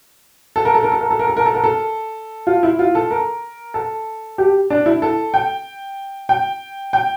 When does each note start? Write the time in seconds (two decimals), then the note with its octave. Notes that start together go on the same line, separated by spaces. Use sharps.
0.56 A4
0.65 A#4
0.74 A4
0.83 A#4
0.92 A4
1.01 A#4
1.11 A4
1.19 A#4
1.28 A4
1.37 A#4
1.46 A4
1.55 A#4
1.64 A4
2.47 F4
2.63 E4
2.79 F4
2.95 A4
3.11 A#4
3.74 A4
4.38 G4
4.70 D4
4.86 E4
5.02 A4
5.34 G5
6.29 G5
6.93 G5